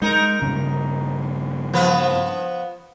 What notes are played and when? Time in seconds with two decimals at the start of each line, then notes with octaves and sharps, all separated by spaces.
0.02 G#3 D#4 A#4
0.42 G2 C#3
1.74 F3 B3 B4